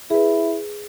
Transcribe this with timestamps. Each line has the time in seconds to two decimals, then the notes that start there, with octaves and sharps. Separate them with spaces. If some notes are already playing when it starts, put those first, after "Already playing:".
0.10 E4 G#4 B4